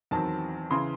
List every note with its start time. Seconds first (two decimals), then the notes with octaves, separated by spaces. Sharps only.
0.11 E2 D#3 F#3 C4 A5
0.70 C#3 E3 C6